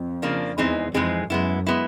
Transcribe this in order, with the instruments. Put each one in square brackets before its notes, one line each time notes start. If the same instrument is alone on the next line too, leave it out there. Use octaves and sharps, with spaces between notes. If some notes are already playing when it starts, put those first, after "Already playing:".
Already playing: [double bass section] F2
[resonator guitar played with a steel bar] C#3 F3 A#3 D4
[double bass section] E2 [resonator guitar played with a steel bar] E3 G#3 C4 D#4 G#4
[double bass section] F2 [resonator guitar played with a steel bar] E3 G#3 C4 D#4 G#4
[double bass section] F#2 [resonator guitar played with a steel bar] G#3 B3 E4
[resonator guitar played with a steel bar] G#3 B3 E4